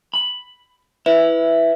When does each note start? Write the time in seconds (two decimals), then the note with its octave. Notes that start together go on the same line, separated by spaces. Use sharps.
0.14 B5
1.06 E4 B4 E5